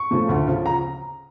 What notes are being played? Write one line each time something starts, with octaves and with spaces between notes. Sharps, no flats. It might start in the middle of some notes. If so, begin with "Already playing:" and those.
Already playing: C#6
C#3 F3 A3
D2
C#3 F3
A#5